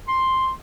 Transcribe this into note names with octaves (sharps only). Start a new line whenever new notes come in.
C6